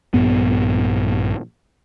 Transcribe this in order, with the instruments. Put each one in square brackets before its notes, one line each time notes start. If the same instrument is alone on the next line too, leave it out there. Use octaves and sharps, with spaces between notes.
[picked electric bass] A#1 G2 B3